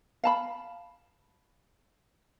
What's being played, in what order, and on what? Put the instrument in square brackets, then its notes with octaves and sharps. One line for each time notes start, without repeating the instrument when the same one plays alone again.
[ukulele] F5 A5 B5